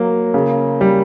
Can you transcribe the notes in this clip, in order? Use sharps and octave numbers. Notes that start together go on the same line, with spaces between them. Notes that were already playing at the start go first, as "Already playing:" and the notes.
Already playing: F#3 A#3
C#3
G3